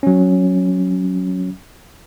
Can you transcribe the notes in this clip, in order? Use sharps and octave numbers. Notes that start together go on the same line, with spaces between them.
F#3 C#4